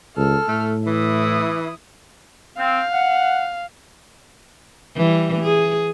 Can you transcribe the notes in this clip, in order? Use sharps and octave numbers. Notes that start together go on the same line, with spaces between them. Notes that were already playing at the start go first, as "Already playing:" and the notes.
C#2 A4 F6
A2 A3
E3 E4 D#6
C4 F5
F#5
E3 G3
G#4